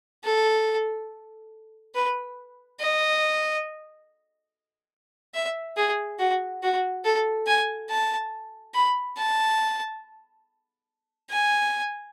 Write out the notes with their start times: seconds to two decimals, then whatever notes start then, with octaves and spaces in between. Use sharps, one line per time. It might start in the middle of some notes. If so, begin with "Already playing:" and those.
0.24 A4
1.94 B4
2.80 D#5
5.34 E5
5.77 G#4
6.19 F#4
6.63 F#4
7.04 A4
7.47 G#5
7.90 A5
8.74 B5
9.17 A5
11.30 G#5